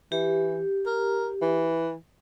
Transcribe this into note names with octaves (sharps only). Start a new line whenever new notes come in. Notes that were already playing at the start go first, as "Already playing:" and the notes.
E3 G4
A#4
E3